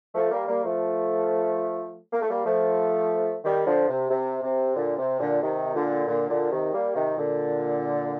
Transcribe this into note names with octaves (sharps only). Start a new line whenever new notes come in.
F3 A3
G3 A#3
G3 A#3
F3 A3
A#3
A3
G3 A#3
F3 A3
D#3 G3
D3 F3
C3
C3
C3
A#2 D3
C3
A#2 D3
C3 D#3
A#2 D3
A#2 D3
A#2 D3
C3 D#3
G3 A#3
C3 D#3
A#2 D3